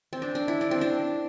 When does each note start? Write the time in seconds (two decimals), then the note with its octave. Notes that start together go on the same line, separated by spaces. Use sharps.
0.13 C4
0.22 D4
0.35 D4
0.48 E4
0.61 D4
0.71 C4
0.81 D4